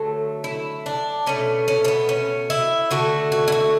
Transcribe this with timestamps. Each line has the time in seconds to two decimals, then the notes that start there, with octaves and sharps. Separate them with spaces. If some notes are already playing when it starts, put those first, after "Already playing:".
Already playing: D3 F#3 A3
0.44 E4
0.86 D4
1.26 B2 A3 C#4
1.68 C#4
1.85 C#4
1.88 B3
2.09 C#4
2.50 E4
2.91 D3 A3 F#4
3.32 F#4
3.48 E4
3.52 F#4